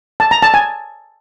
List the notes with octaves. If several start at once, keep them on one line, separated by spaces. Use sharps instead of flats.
A5
A#5
A5
G#5